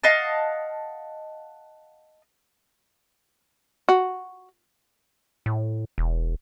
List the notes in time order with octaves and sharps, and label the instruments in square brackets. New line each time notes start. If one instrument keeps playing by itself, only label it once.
[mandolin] D#5 F5 F#5 A5
[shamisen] F#4
[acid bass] A2
E1